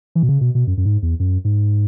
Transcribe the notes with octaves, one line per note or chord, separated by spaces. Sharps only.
E3
B2
C#3
B2
B2
F#2
F#2
G#2
E2
F#2
G#2